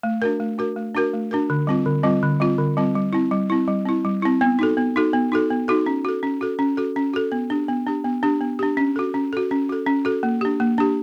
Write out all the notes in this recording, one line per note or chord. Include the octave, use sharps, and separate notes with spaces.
A3
D4 F#4 A#4
A3
D4 F#4 A#4
A3
D4 F#4 A#4
A3
D4 F#4 A#4
D3
G3 C4 F4
D3
G3 C4 F4
D3
G3 C4 F4
D3
G3 C4 F4
G3
C4 E4
G3
C4 E4
G3
C4 E4
G3
C4 E4
B3
D#4 F#4 A4
B3
D#4 F#4 A4
B3
D#4 F#4 A4
B3
D#4 F#4 A4
C#4
F#4 A4
C#4
F#4 A4
C#4
F#4 A4
C#4
F#4 A4
B3
D4 G4
B3
D4 G4
B3
D4 G4
B3
D4 G4
C#4
F#4 A4
C#4
F#4 A4
C#4
F#4 A4
C#4
F#4 A4
A#3
D4 G4
A#3
D4 G4